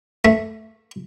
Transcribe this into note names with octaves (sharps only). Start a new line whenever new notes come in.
A3